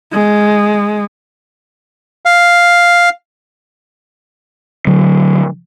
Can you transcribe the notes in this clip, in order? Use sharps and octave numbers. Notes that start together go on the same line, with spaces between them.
G#3
F5
D3 F#3